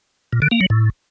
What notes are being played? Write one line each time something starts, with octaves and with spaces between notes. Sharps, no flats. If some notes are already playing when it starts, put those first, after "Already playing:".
A#2
D3
A#3
F#3
A2